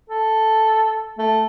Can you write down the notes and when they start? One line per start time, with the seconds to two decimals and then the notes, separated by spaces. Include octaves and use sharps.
0.10 A4
1.18 A3